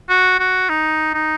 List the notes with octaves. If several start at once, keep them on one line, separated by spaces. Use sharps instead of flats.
F#4
F#4
D#4
D#4